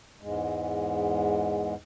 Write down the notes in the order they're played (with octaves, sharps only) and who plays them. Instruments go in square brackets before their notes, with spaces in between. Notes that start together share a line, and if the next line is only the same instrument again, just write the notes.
[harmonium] E2 G#2 G#3